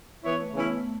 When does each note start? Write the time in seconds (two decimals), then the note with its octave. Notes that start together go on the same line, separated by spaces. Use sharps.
0.24 E3 B3 E4 C#5
0.39 A3
0.53 C#3 E3 B3 C#4 E4
0.84 A3